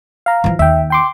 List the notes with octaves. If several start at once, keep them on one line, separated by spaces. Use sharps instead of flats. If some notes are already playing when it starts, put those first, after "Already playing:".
F5 A#5
E3 F3
D#2 E5 G5
G5 C6 D6